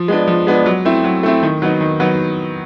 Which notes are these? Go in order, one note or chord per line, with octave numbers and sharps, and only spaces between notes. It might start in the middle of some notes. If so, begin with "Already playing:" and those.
Already playing: F3
G#3 B3 D4
F3
G#3 B3 D4
F#3
A3 C4 E4
F#3
A3 C4 E4
D#3
F#3 B3 D#4
D#3
F#3 B3 D#4